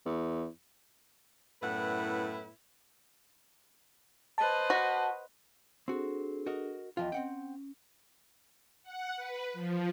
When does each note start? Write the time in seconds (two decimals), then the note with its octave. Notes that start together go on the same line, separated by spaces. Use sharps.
0.06 E2
1.63 F#2 A2 B3 E4 B4 F#5
4.38 B4 C5 D#5 A5
4.70 F#4
5.88 C4 D4 F#4 G#4 A4
6.46 F#4 A#4 D#5
6.97 E2 F3 F4 D#5 G5
7.12 C4 C#4 F#5 G5
8.83 F#5
9.16 B4
9.54 F3